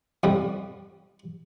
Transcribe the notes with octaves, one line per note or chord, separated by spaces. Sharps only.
F2 G3